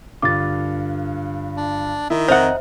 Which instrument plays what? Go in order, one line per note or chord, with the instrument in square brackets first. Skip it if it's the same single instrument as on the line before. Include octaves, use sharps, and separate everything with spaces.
[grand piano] G2 D3 F4 [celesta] D6 A6
[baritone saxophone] D4
[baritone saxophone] D#3 [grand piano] E4
[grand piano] F2 D#5 [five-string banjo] D#4 F#5 [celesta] C5 E5